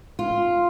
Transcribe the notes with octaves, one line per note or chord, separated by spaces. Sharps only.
F4